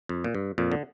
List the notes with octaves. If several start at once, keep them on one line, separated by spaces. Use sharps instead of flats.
F2
A#2
G2
F2 A#2
D3